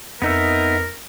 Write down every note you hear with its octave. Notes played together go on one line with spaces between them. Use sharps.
F2 B3 D#4 A#4 E5